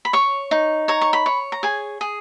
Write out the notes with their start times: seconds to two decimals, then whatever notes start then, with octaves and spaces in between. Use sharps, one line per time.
0.05 B5
0.13 C#5 C#6
0.51 D#4
0.88 C#5 A#5
1.01 C#6
1.13 B5
1.26 C#5
1.52 A#5
1.63 G#4 G#5
2.01 G#4